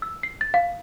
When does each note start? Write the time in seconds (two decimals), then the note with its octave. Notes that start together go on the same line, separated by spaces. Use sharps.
0.02 E6
0.23 C7
0.41 A6
0.54 F5